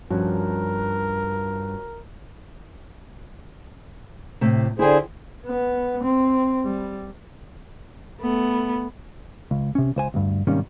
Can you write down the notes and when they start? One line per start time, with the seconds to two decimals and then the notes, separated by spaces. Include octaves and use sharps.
0.11 G2 F3 C#4 F#4 A#4
4.41 A2 C3
4.79 D3 E4 G#4 C5 G5
5.46 B3
6.03 C4
6.64 G3
8.20 A3 B3
9.51 C#2
9.75 C3 C#4
9.96 C#2 C5 G#5
10.14 D2 G2
10.47 G#2 C3 D#3 G3 A#3 C#4